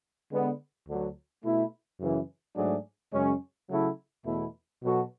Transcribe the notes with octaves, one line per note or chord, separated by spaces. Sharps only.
D3 G#3 B3
D2 D3 F#3
B2 A3 E4
F#2 C#3 E3
G#2 F#3 A3 D4 G#4
F#2 C#3 G#3 C#4
C#3 F#3 A3 E4
E2 B2 A3 E4
B2 F#3 B3 F#4 A4